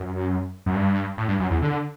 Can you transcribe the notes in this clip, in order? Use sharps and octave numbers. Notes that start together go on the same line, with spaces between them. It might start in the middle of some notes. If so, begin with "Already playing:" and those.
Already playing: F#2
F#2
G2
A2
G2
F#2
E2
D3